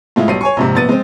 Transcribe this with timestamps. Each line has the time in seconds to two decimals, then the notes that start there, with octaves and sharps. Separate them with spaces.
0.16 A2 G#3 E4 F4
0.28 B1 G3 C7 D#7
0.41 C#5 G#5 C#6
0.57 A#1 G#2 C3
0.75 A#1 B3 A6 D#7
0.89 G#3 C4